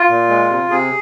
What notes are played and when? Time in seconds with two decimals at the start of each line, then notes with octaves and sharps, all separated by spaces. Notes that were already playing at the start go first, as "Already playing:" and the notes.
Already playing: F4
0.09 A#2
0.29 G#3
0.50 C3
0.70 C3 G#4